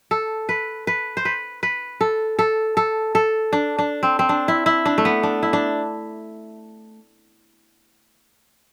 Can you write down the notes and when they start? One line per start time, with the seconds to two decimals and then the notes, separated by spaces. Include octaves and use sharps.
0.11 A4
0.49 B4
0.87 B4
1.17 C5
1.25 B4
1.63 B4
2.01 A4
2.39 A4
2.77 A4
3.15 A4
3.53 D4
3.79 D4
4.03 C4
4.19 C4
4.29 D4
4.48 E4
4.66 E4
4.85 D4
4.98 A3
5.05 B3
5.23 D4
5.43 E4
5.53 D4